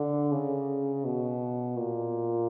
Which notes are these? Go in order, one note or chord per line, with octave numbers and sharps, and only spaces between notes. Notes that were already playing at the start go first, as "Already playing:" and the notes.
Already playing: D3
C#3
B2
A#2